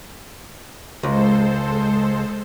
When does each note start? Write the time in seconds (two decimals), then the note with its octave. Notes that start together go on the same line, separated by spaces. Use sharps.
1.03 C#2 G#3 A4 C5